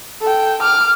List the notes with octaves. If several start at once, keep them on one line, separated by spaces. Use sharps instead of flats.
A4 G5
D6 F6